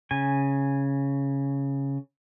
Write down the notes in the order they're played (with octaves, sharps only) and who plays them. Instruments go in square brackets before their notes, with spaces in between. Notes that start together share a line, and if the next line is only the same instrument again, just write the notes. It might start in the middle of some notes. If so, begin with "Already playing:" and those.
[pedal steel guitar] C#3 G#5